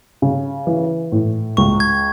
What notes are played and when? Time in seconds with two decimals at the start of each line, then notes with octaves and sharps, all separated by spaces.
0.22 C#3
0.67 E3
1.12 A2
1.57 C#2 C#6
1.80 G#6